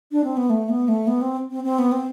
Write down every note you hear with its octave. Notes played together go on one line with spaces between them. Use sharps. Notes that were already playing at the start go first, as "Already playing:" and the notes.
D4
C4
B3
A3
B3
A3
B3
C4
C4
C4
B3
C4